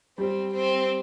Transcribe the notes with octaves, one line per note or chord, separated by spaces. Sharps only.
G3 C4
C4